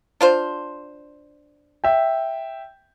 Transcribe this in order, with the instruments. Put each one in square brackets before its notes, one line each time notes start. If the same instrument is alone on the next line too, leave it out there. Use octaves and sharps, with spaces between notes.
[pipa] D4 F4 C5
[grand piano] E5 G5